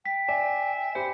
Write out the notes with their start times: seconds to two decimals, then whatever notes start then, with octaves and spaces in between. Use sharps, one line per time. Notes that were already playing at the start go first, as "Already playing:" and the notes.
0.05 G5 B6
0.29 D5 E5 G#5
0.95 G4 C5 B5 C#7